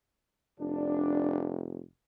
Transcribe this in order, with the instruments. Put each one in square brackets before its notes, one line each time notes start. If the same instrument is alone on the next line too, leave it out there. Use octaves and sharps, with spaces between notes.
[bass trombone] F1 [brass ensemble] D4